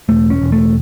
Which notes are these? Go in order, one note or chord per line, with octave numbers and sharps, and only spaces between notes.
E1 A3
C#4
E1
A3